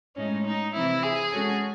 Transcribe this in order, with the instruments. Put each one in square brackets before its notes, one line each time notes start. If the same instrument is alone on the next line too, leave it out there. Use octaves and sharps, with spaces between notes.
[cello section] A2 G#3 D#4 [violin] C#4
[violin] D#4
[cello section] C3 E3 C4 [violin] E4
[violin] G#4
[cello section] G#3 C#4 F#4 A4